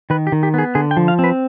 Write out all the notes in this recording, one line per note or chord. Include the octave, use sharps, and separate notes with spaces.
D#3 B4
G4
D#3
G4
B3 G#4
D3 G#4
G5
F3
F5
C4 B4